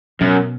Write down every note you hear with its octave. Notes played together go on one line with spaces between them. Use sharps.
F#2 B2